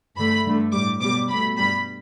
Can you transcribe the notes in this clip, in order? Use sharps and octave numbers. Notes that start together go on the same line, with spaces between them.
G2 D3 A3 B5
G2 D3 A3
A2 G3 D6
B2 G3 D6
B2 A3 B5
G2 G3 B5